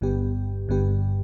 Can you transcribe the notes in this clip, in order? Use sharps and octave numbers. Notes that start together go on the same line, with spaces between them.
G1 G2 D3 B3 G4
G1 G2 D3 B3 G4